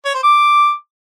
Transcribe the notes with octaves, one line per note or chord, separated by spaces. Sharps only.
C#5
C5
D6